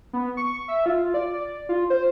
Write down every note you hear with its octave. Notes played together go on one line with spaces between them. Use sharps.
B3
C#6
E5
F4
D5
F4
C5